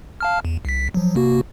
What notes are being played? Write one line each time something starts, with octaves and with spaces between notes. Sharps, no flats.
F5 A5 F6
E2
C2 B6
F3 F#3
C3 A#3 F#4